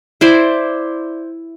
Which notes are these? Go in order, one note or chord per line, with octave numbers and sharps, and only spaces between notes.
E4 C5 D5